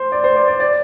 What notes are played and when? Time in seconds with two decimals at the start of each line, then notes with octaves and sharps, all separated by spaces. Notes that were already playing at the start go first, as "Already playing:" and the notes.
Already playing: C5
0.12 D5
0.24 C5
0.36 D5
0.48 D5
0.60 D5